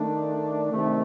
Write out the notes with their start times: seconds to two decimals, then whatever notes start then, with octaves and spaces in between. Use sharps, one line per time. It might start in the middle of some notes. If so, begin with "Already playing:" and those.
Already playing: D#3 A3 D4
0.71 C3 D#3 A3